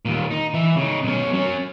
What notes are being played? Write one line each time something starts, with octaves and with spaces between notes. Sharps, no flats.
D#2 A#2
D#4
E3 E5
C#3 D#4
B1 C#4
F#3 C#4